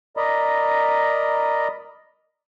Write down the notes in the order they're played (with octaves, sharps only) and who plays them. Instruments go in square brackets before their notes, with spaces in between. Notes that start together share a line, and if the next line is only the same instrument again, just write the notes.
[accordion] A#4 D5 D#5 A#5 B5